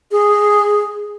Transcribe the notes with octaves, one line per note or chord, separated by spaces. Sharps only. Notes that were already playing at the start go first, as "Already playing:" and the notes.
G#4